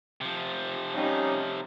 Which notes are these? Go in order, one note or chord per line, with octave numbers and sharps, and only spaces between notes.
C3 F3
G3 C#4 D#4